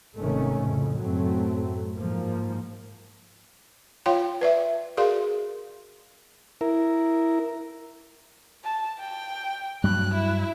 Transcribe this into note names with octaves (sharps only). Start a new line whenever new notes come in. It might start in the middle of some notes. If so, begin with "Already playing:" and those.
G#1 C3 D#3 A3 C#4
F2 A2 C#3
F#2 A2 F#3 A3 C4
G#2 F3 A#3
F4 C#5 F5 G5 C6
B4 D5 E5
F#4 G#4 A#4 D5 F5 C6
E4 A#4
A5
G5
G2 F#3 F#6
E4